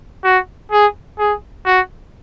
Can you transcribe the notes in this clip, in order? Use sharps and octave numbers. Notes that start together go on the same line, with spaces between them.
F#4
G#4
G#4
F#4